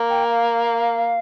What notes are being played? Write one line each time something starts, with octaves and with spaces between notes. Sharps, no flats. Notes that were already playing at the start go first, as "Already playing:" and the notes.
Already playing: A#3
G5
F5